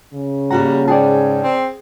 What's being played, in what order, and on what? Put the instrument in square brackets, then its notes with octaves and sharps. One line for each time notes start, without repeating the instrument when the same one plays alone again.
[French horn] C#3
[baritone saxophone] G3 [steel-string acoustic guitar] A#3 F#4 F#5 [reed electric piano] A#5
[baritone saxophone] G#2 [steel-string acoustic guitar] G#4 [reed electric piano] D5 G5 A5
[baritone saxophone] C4